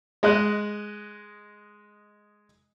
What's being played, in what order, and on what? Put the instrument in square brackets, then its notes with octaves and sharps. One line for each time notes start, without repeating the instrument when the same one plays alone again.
[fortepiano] G#3 D#5 F#6